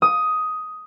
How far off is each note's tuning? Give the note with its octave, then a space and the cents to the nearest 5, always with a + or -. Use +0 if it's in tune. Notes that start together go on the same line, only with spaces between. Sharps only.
D#6 +10